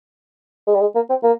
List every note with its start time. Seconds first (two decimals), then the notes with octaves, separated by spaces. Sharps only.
0.67 G#3
0.75 G3
0.81 G#3
0.95 A#3
1.10 C4
1.23 A#3